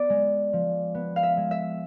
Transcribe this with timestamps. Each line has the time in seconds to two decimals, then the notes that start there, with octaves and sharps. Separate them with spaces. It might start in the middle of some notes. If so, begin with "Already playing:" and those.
Already playing: B3 D5
0.10 G#3
0.53 F3
0.95 B3
1.16 F5
1.23 E5
1.37 G#3
1.51 E5